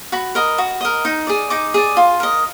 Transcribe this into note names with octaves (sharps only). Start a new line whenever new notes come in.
F#4 B5
A#4 D#5
F#4
A#4 D#5
D#4
G#4 D5
D#4 D6
G#4 D5
F4
A#4 D#5